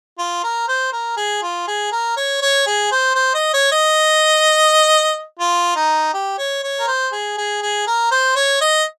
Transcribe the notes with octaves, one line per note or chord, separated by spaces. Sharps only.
F4
A#4
C5
A#4
G#4
F4
G#4
A#4
C#5
C#5
G#4
C5
C5
D#5
C#5
D#5
F4
D#4
G4
C#5
C#5
A#4
C5
G#4
G#4
G#4
A#4
C5
C#5
D#5